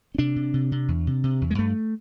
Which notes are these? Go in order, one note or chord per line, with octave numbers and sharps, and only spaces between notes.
C#4
C3 D4
C3
C3
C3
E2
C3
C3
E2
G#3
G2 A3